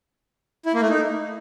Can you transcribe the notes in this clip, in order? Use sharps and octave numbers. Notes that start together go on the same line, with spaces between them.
E4
A#3
A3
D#4